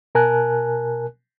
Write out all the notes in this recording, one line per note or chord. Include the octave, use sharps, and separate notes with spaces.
B2 A#4 G#5 A5 F#6